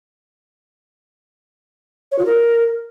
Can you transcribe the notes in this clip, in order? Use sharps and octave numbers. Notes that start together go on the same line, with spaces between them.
C#5
F4
A#4